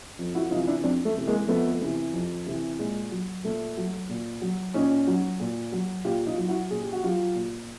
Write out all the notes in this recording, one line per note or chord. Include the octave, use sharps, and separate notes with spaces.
F2
E4 F#4
C3 E3 D#4 F4
D4 E4
F2 C4 D4
A3
C3 E3
G#3 A#3
F2 A3 B3
C3 E3
F2
C3 E3
A#2 G#3
F#3
A#2 A3
F#3
A#2
F#3
A#2 C#4 D#4
F#3
A#2
F#3
A#2 F4 G4
D#4 F4
F#3
E4 F#4
A#2 G#4
G4
F#4
F#3 F4 G4
A#2